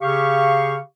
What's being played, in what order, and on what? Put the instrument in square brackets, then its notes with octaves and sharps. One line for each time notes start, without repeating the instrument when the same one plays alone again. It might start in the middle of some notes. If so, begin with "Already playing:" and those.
[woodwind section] C#3 G4 F5 C#6